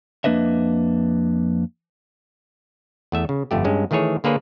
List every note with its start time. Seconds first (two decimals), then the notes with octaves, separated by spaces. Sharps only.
0.24 F2 A#3 D4 B4 D#5 E5
3.12 E2 A3 E5
3.29 C#3
3.51 G1 F2 A3 G4
3.64 G2 G#3 C#4
3.91 D#3 E3 A3 G#4 C#5
4.24 D3 A#3 G#4 B4 C#5